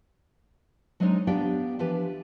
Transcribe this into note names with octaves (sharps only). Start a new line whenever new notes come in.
F#3 G#3 C4 D4 D#4 C#5
B3 D4 G4 D5 F5 G5
E3 F3 D4 G4 B4